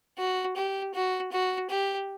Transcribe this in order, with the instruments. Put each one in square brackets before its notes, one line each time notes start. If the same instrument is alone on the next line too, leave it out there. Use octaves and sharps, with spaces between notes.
[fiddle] F#4
G4
F#4
F#4
G4